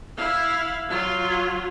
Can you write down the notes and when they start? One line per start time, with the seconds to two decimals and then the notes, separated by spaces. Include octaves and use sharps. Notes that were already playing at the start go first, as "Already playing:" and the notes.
0.16 E4 F5
0.89 F#3 F4